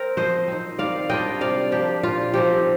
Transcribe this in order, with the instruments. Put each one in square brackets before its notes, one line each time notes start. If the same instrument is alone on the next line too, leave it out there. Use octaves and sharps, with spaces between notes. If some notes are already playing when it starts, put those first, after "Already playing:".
Already playing: [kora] C4 A#4
F3 C5 D#5
C4 D#4
D#3 D5 F5
G3 D4 F4 D#5 G5
C3 D5 F5
F3 A#3 D4 G4
A#2 F4
F3 C4 D#4 G4